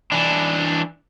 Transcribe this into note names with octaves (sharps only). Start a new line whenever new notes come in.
E3 D4